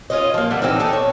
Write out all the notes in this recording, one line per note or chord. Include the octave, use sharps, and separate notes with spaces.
C#4 F4 D#5
F3 A#3
D3 G3 D4 F#5
E3 C4 D4 D#4
D4 D#4 A4
C#5